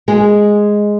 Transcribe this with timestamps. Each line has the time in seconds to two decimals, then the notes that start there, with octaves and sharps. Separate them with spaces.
0.08 G#3 G#4